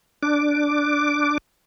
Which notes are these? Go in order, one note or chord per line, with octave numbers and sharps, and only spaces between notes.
D4 D6